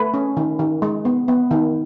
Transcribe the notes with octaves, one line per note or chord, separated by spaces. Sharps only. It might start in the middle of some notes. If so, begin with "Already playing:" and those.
Already playing: A3 B4
C#4
D#3
D#3
G#3
B3
B3
D#3